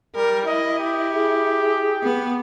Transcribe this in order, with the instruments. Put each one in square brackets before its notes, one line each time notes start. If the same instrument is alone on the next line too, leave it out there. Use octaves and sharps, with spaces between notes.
[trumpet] G3 [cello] A#4
[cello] E4 [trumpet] D#5
[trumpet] G4
[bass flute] G#4
[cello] B3